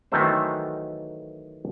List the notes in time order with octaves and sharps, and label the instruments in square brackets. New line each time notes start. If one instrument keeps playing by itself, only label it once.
[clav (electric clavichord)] D#3 E3 F#3 A3 F#4 C5